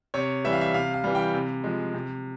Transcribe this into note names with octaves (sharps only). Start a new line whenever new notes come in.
C3 C#5
E3 G3 E5
F5
E5
C3 F5
F5
E3 G3
G5
C3
F3 G#3
C3